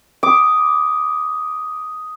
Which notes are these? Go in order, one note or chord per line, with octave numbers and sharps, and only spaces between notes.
D6 D#6